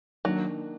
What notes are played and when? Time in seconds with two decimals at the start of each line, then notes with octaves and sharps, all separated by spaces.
0.25 D#3 F#3 A#3 D4